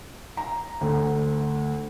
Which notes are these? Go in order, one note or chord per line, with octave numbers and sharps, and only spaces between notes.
A#5
D2